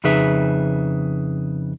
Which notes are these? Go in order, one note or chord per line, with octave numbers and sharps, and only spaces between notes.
F2 C#3 D#4 G#4 B4 E5